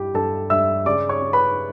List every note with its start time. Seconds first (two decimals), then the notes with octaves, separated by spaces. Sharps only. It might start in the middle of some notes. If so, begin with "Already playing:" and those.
Already playing: G2 E4 G4 G5
0.14 G2 A4 A5
0.50 G2 E5 E6
0.86 C#3 D5 D6
1.09 C#5 C#6
1.22 C#3
1.33 B4 B5